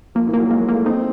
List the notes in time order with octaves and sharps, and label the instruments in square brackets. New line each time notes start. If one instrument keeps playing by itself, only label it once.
[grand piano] F3 [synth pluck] A#3
[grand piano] E3
[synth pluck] A#3
[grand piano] F#3
[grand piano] G#3 [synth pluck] A#3
[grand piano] A3 [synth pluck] A#3
[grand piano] C4 [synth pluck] D#4